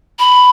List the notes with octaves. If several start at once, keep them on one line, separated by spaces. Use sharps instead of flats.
B5